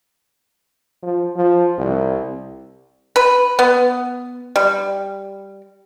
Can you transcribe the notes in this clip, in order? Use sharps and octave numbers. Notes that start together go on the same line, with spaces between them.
F3
F3
C2
B4
B3
G3